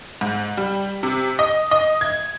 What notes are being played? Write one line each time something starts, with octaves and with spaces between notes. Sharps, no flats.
G#2
G3
C3
D#5
D#5
G#6